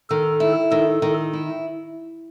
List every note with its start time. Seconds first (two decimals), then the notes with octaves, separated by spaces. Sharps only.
0.10 D#3 A4
0.40 E4
0.71 D#3 A4
1.02 D#3
1.33 E4